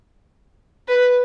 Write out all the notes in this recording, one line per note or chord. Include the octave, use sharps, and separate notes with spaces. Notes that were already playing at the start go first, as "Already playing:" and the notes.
B4